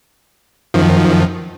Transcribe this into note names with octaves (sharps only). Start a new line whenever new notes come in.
F#2 D#3 F3